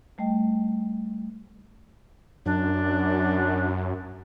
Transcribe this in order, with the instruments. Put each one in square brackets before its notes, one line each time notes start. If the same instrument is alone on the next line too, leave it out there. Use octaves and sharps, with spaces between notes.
[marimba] G3 A3 D#5 G5
[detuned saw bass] F#2 [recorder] D4